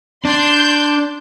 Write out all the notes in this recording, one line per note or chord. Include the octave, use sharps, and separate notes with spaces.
D4 C6 G6